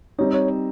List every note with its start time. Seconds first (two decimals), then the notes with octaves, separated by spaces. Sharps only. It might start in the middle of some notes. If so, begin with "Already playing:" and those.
0.18 G3 C4 D#4 C#5
0.34 C#5